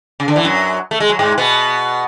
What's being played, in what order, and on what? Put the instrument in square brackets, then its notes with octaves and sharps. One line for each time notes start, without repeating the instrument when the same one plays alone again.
[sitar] C#3
D3
E3
F#2 F#3
A3
G#3
F#3
G#2 G#3
B2 B3